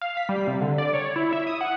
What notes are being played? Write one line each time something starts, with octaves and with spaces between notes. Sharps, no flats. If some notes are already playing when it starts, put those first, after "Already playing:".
F5
B6
G3
C3
D3
D5
C#5
E4
E5
D#6
F#5